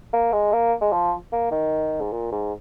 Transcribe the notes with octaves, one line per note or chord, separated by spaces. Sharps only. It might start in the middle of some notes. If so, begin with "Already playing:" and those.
A#3
G#3
A#3
G#3
F3
A#3
D#3
G#2
A#2
G#2